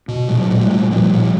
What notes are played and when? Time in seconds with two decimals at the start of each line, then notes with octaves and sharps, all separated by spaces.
0.08 B2
0.28 A#2 F#3 G#3
0.50 A#2
0.60 G3 A3
0.71 A#2
0.91 A#2 F3 G3
1.12 A#2